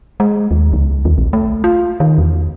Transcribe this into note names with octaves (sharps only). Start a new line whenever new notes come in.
G#3
D#2
C#2
D#2
A#1
A3
F4
D#3
E2